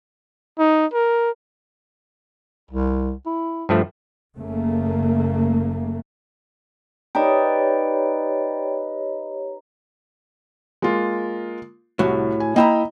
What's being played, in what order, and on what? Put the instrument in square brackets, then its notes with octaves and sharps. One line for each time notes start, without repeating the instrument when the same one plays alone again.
[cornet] D#4
A#4
[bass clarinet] C2
E4
[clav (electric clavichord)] G2 F3 A3
[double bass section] F#1 C#3 A3 A#3
[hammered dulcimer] D#4 B4 [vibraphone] G4 C#5 [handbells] D5 G5
[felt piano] G#3 A#3 F4
[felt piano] C2 [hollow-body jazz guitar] A2 F#4
[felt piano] G#5
[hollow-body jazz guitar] A#3 E4 A#5 [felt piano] D#5 G5 B5